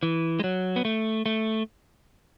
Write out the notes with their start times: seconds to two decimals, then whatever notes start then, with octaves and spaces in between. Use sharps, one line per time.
0.03 E3
0.39 G#3
0.44 F#3
0.76 B3
0.85 A3
1.26 A3